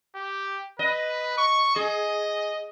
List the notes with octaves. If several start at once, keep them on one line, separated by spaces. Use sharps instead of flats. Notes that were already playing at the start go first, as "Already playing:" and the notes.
G4
B4 D#5
C#6
G#4 D#5